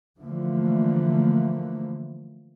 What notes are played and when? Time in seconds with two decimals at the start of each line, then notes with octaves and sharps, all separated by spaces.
0.19 D3 E3 F3 A3 A#3